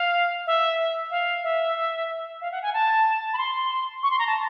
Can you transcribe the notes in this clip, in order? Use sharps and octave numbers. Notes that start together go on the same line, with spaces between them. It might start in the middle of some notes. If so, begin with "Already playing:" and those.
Already playing: F5
E5
F5
E5
F5
F#5
G#5
A5
B5
C6
C#6
C6
A#5
A5